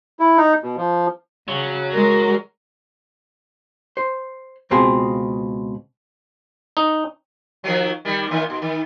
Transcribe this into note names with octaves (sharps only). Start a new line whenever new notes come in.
E4
D#4
B2
F3
C#3 F#3
G#3 A#4
C5
C#2 B2 C4 F4 G#4 A5
D#4
D#3 F3 F#3
D#3 G3
A#2 D#3
B2
D#3